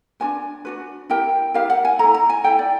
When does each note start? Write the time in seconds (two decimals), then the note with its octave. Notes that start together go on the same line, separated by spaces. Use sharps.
0.20 D4 F#4 B4 G#5
0.65 D4 F#4 B4
1.10 E4 G4 A#4 G5
1.54 E4 G4 A#4 F5
1.70 F#5
1.85 G#5
1.99 E4 A4 A#5
2.14 A#5
2.30 G#5
2.44 E4 A4 G5
2.59 D5